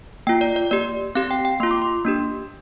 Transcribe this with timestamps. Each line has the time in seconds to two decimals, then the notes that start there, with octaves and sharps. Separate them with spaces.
0.27 A#3 F4 G5
0.41 D5
0.56 D5
0.71 A#3 G4 D5
1.15 C4 G4 F5
1.31 G5
1.45 G5
1.60 A#3 F4 C6
1.71 D6
1.82 C6
2.05 A#3 D4 G4